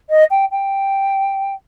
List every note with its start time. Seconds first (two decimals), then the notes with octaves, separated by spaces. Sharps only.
0.10 D#5
0.31 G5
0.51 G5